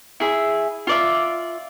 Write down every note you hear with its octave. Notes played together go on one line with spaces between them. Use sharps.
E4 G#4 E5
F4 D5 E5